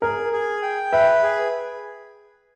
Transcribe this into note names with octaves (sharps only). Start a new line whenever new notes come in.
G#4 A#4
G#4
G5
B4 E5
G#4